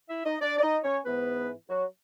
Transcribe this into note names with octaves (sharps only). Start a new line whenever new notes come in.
E4 E5
D#4 D#5
D4 D5
D5
D#4 D#5
C#4 C#5
G#2 E3 B3 B4
F#3 F#4